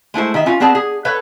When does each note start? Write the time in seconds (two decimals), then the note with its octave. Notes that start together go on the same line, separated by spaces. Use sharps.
0.14 G#3 A3 E4 C5
0.34 D#3 D#5 E5
0.46 C#4 F4
0.60 B3 C4 G#4 D5 A5
0.75 G#4
1.05 A4 B4 C#5